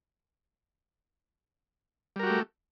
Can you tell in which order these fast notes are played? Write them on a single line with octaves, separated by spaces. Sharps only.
G3 A#4 F#4 G4 A3